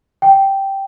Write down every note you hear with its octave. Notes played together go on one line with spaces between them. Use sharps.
G5